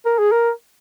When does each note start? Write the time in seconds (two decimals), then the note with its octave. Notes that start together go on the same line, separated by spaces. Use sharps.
0.06 A#4
0.19 G#4
0.32 A#4